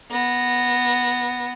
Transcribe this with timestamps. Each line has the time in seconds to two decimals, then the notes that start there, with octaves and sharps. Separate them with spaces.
0.11 B3 A#6